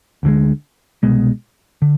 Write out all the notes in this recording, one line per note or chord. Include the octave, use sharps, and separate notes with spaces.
D2 D3 F3 G#3
C2 B2 G#3
D3